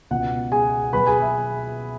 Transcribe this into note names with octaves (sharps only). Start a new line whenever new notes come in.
C#2 B2 B3 F#5
G#4 G#5
B2 F#3 B3 B4 B5
G#4 G#5
E5